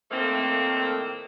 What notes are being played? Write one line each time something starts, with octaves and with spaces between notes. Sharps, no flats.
A2 D#3 F3 A3 A#3 C4